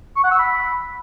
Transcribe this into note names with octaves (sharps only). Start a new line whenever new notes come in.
C#6
F#5
E6
B5